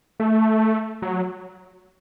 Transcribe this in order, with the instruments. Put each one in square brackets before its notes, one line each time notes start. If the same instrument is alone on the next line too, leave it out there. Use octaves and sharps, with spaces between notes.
[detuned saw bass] A3
F#3